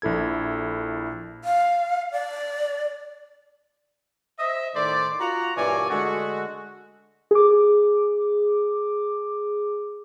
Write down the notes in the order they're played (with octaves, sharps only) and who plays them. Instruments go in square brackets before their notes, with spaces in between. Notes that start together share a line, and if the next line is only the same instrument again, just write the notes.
[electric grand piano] A#1 E4 A4 G#6
[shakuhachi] F5
D5
[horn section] C5 D#5 E5
A2 D#3 A3 C5 D5
F4 F#4 A#5
G2 A#2 E3 C#5 D5 G#5
D3 G#3 A3 F#4
[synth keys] G#4 D6